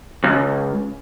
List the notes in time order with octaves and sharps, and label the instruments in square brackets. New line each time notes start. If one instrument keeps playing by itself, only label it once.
[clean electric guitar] C#2